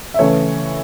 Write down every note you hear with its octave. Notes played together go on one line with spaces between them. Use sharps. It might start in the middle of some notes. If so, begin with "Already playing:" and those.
E5
C#3 E3 A3 C#5